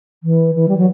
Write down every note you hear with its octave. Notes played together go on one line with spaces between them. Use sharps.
E3
E3
G3
F#3